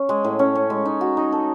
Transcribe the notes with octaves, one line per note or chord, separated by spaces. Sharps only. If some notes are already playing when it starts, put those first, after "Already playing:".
Already playing: C#4
G#3
A2
C#4
C#4
G#3
D#4
F#4
D#4
A4